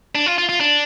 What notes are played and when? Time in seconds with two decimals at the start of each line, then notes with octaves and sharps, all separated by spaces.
0.15 D4
0.26 F4
0.38 F4
0.49 F4
0.60 D4